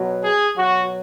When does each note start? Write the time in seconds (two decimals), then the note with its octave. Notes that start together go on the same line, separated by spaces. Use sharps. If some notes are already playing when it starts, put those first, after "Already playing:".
Already playing: B2 F#3
0.23 G#4
0.57 B2 F#3 F#4